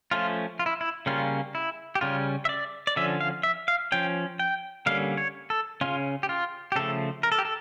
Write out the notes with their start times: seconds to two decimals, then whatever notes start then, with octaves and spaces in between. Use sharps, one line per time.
0.11 F3 A3 C#4 F4
0.59 F4
0.66 E4
0.81 E4
1.06 C#3 G3 A#3 C#4 F4
1.55 E4
1.95 G4
2.01 C#3 G3 C#4 F4
2.45 E5
2.49 D5
2.87 D5
2.96 D3 F3 C#4 E5
3.21 F5
3.43 E5
3.68 F5
3.92 F3 C#4 G5
4.39 G5
4.86 D3 G3 A#3 C#4 F5
5.17 C#5
5.50 A4
5.81 C#3 F3 C#4 F4
6.23 G4
6.29 F4
6.72 G4
6.76 C#3 F3 A3 A4
7.23 A#4
7.32 A4
7.38 G4
7.45 A4